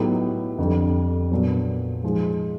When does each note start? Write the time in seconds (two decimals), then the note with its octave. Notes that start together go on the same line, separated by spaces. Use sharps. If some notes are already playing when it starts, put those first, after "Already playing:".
Already playing: A2 F#3 B3 D#4 G4
0.59 F2 D3 G3
1.31 A#2 F#3 B3 D4
2.03 G#2 F3 G#3